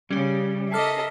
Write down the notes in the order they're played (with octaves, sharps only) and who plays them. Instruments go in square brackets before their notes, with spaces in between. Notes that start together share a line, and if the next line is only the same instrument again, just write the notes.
[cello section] C#3 [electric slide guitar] G3 [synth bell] C#4 G4
[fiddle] A4 D#5 [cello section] A#4 E5 [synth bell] D6 F6 C7